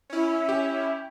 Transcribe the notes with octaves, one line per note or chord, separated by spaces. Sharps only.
C#4 E4
G4